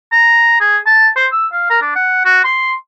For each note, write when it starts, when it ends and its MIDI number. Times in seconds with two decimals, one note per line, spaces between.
0.12 0.59 82
0.60 0.77 68
0.86 1.09 81
1.16 1.26 72
1.32 1.46 88
1.52 1.66 77
1.70 1.77 70
1.82 1.91 62
1.95 2.22 78
2.25 2.42 66
2.44 2.72 84